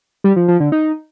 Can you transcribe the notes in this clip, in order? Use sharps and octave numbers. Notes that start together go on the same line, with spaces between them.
G3
F3
F3
D3
D#4